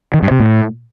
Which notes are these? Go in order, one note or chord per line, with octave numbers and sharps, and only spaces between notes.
D#3
G2
C3
A2